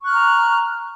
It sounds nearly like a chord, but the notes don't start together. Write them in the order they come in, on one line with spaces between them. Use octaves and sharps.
C#6 F#6 F6 A#5